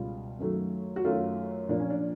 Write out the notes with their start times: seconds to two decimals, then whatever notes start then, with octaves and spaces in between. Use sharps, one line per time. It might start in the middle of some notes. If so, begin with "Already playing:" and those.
Already playing: C#2 B2 G3 B3 F4
0.39 F#2 D#3 F#3 A3
0.96 F#4
1.04 F#2 D#3 F#3 A3 F4
1.69 A#2 F3 A#3 D4
1.79 C#4
1.90 D4